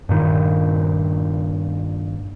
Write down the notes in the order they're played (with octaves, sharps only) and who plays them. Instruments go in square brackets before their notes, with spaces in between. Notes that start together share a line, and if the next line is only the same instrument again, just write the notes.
[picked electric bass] G2 A#2 D#3